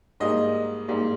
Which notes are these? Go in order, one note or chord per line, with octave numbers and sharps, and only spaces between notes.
G#2 G3 A#3 D#5
G#2 G3 A#3